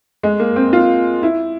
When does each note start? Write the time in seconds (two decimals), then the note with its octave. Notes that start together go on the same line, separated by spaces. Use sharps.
0.23 G#3
0.40 A#3
0.56 C4
0.73 F4
1.23 E4